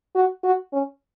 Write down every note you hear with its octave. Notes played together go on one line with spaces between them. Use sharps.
F#4
F#4
C#4